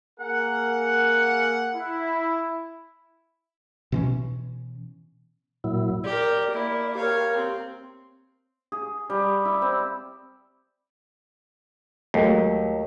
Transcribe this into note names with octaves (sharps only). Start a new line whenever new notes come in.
A#3 G#4 A#4 F#5
E4
B2 E3 C#4
A#2 F#3 E4
G4 A#4 D5
A#3 E4
G4 A#4 C#5 F5
C4
G#4
G3
E4
C4
D#2 F#3 G#3 A3